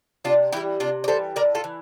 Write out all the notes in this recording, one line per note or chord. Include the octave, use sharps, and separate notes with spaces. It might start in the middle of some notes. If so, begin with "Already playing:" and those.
C3 D4 F4
E3 G3 E4 G4
C3 D4 F4
D5
E3 G3 A4 C5
A2 A#4 D5
F4 A4
E3